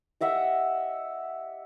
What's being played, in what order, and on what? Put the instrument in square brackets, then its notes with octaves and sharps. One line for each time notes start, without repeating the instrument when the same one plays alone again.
[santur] G4 D#5 E5 F#5